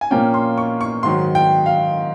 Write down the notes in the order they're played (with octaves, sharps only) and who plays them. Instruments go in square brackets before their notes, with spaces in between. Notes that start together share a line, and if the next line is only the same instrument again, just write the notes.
[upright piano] G#5
A#2 F3 A#3 C#4 G5
C6
C#6
C#6
G#2 D#3 F#3 C6
G5
F5